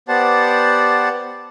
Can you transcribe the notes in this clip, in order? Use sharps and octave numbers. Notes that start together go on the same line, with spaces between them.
B3 G4 C5 D5 F#5 A5